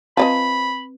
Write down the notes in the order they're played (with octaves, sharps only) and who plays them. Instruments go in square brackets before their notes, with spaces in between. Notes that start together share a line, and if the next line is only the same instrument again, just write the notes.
[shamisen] F3 D5 D#5 [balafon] C4 B4 [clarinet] B5